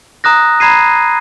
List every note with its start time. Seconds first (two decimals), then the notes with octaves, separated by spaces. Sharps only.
0.24 A#5 D#6 F#6 A#6
0.60 A#5 B5 G#6 C7 D#7